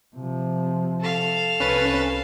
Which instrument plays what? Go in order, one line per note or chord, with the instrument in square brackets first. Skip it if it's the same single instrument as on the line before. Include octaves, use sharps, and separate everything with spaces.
[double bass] C3 F3
[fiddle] A4 F5
[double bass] C2 [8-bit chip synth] C#4 B4 A6